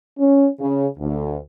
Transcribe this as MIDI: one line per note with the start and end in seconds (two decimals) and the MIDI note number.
0.19 0.47 61
0.60 0.86 49
0.99 1.35 38